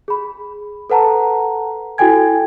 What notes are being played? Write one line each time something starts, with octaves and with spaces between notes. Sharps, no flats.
G#4 B5
A4 B4 F#5 A5 A#5
E4 F#4 A4 G5 G#5 G#6